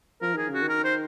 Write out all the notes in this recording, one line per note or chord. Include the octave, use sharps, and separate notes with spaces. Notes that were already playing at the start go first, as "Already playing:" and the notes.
F3 A#4
D#3 G#4
C#3
F#4
D#3
A#4
C5